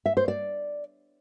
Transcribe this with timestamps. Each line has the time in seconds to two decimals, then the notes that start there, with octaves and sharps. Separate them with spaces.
0.06 E5
0.17 C5
0.28 D5